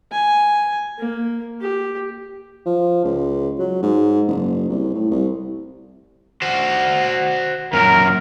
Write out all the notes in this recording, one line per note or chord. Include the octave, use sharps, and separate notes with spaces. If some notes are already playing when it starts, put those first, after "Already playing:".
G#5
A#3
G4
F3
C#2
F#3
G#2
F#1
C2
A2
C2
F#4 C5
F#2 A#2 A#4